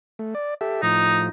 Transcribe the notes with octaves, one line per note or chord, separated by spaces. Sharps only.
A3
D5
G4 A4 E5
A2 F3 D#4